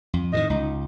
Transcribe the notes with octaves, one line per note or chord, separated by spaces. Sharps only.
F2
A2 D3 D#3 D#5
C#2 D#4